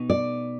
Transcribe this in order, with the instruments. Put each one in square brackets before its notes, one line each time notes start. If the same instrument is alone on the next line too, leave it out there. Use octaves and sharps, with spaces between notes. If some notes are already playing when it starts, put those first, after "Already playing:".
Already playing: [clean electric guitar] B2 B3 D#4
[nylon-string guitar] D5